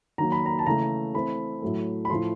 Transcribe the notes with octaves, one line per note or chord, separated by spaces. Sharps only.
D#3 F#3 A#3 A#5
B5
A#5
A5
C#3 E3 A3 A#5
E3 A3 C4 B5
A2 F#3 A3
B5
A2 F3 A3 C6